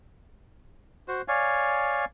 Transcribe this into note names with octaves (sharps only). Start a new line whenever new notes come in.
F#4 C5
C#5 D5 F5 G#5